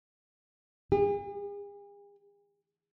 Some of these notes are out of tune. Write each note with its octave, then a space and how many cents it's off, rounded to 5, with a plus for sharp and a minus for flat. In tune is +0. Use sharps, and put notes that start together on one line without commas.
G#4 -45